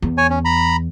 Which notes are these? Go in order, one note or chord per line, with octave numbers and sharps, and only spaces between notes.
E2
C#5 G#5
C#4
A#5 B5